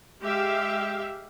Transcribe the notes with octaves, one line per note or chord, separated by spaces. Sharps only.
G#3 G4 E5 F5